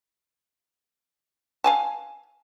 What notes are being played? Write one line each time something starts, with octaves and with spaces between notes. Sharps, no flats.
F5 G#5 A5